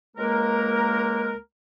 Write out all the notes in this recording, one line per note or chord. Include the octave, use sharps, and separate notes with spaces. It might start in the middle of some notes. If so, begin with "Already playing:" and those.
C#2 G#3 A#3 A#4